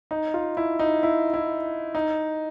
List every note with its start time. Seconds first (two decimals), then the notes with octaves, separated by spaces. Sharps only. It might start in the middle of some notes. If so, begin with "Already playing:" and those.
0.11 D#4
0.34 F4
0.57 E4
0.79 D#4
1.03 E4
1.34 E4
1.95 D#4